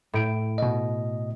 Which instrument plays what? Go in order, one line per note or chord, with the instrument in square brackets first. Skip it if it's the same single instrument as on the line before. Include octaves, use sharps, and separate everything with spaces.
[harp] A2 D7
[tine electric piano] B2 D#5